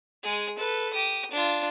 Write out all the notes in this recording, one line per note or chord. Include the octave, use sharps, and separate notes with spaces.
G#3 G#4
A4 B4
G4 D#6
D4 F4